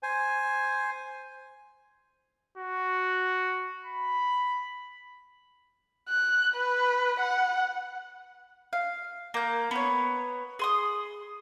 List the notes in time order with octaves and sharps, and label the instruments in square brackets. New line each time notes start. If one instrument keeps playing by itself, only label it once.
[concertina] C5 G#5
[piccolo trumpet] F#4
B5
[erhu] F#6
B4
F#5
[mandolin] F5
A#3 G6
B3 C#5
G#4 C6 D#6